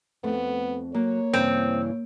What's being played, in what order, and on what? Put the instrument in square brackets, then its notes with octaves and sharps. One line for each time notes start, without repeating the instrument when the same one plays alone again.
[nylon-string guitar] F2 A3 C4 [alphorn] B3
[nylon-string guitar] F#3 [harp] A#3 [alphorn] C#5
[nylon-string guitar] G2 C#3 E3 [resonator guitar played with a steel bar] C4